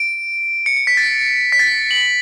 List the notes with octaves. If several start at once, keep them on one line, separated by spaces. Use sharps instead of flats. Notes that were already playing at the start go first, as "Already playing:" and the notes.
Already playing: D7
C#7
C#7
B6
A6
B6
A6
F#7